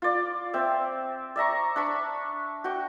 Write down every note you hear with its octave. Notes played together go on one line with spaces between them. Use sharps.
F4 D5
C4 E5
D5 E5 A#5 C#6
D4 B5 C#6
F#4 G5